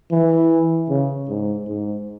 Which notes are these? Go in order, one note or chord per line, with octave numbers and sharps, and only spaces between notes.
E3
C#3
G#2
G#2